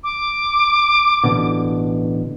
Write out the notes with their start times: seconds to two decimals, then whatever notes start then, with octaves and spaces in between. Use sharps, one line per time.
0.04 D6
1.24 A1 B2 D3